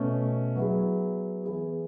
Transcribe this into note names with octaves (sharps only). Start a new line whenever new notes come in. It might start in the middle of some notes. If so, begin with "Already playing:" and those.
Already playing: B2 A3 C#4
F#3 B3 E4 G#4
E3 B3 E4 G#4